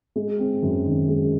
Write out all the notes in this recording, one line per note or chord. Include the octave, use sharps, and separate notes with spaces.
G#3
C4
F#2
D#3
G#3